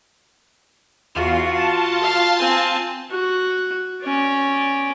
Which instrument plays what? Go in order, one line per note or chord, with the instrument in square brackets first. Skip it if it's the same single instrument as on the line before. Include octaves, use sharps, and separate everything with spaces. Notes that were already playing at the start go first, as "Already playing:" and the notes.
[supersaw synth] E2 F4 [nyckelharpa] F#4
[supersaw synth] F4 A5
[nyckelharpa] F5
C4 G#5
F#4
C#4 D5